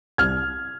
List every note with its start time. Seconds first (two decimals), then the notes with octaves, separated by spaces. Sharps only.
0.18 C2 F6 G#6